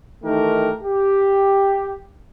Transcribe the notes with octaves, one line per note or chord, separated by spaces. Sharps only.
D#3 E3 A3 D#4 G4 A#4
G4